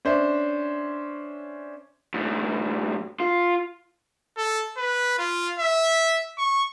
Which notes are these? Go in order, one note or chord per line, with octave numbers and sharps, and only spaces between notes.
C#4 D4 C5 E5
F#2 A2
F4
A4
B4
F4
E5
C#6